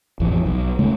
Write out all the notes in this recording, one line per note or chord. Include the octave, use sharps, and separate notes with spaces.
A1 F2 E3
B1
C#3 G#3 A3